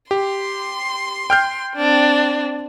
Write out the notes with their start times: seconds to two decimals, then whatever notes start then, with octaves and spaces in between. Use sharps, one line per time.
0.11 G4 C6
1.30 G5 F6 G6
1.75 C4 D4